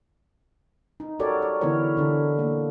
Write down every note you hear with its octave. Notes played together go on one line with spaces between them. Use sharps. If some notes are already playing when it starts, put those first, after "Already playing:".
D#4
F#4 G4 A4 A#4 C#5 D5
D5
D3 E3 B3 E4 A#4 C#5
D3 D4
A#3